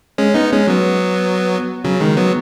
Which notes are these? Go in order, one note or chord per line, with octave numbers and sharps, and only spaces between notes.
G#3 C#4
B3 D#4
G#3 C#4
F#3 B3
C#3 F#3
D#3 G#3
F#3 B3